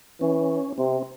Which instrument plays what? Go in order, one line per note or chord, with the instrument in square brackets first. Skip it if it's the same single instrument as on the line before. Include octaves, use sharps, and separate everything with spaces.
[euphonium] E3 [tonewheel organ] C#4
[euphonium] C3 [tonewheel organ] C4